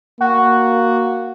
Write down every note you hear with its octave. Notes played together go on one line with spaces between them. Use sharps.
A#3 F#4